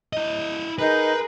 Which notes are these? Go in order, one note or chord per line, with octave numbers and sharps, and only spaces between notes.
E4 D#5
D#4 G#4 A#4 B4